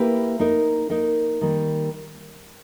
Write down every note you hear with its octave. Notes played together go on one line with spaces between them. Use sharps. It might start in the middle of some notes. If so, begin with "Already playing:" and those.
Already playing: A#3 E4 G4 B4
A#3 D#4 A#4
A#3 D#4 A#4
D#3 G3 A#3